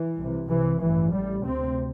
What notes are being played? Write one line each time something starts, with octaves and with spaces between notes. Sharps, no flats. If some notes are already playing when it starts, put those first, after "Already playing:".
Already playing: E3
C2 C3
C2 C3 E3
A1 G2 E3
A1 A2 G3
D2 C3 C4